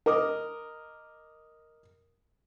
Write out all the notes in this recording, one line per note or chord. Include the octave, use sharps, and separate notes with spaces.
A#4 D#5 D6 D#6